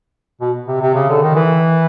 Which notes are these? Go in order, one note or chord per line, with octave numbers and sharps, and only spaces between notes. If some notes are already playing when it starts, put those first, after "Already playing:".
B2
C3
C3
C#3
D3
D#3
E3